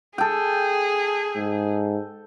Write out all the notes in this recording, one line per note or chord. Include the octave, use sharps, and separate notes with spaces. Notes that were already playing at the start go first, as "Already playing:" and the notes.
G#4 A4 G5
G#2